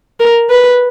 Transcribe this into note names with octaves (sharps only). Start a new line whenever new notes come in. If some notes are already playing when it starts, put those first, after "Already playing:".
A#4
B4